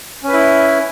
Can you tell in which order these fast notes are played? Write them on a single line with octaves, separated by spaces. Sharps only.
C#4 B4 E4